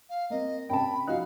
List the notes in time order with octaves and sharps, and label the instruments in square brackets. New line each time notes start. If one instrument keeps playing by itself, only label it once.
[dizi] F5
[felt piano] A#3 C4 [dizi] D#5
[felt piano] F#2 C3 [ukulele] G5 A5 [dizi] B5
[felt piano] F3 D#5 F#6 [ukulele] D#4 F#4 [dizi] F5